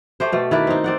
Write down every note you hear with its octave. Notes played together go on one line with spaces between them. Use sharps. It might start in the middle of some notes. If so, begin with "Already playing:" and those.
A3 G4 C5
B2 A3
D#3 E4 B4 D5
C4 D#4
C4 D5 F#5